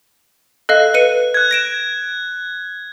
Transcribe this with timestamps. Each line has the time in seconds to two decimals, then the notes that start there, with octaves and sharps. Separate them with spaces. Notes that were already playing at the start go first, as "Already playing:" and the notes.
0.69 A4 D#5 F5 F#6
0.94 B4 C#7 D#7
1.34 F#6 G#6
1.51 A#6 D7 E7